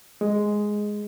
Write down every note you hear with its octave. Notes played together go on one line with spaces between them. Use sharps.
G#3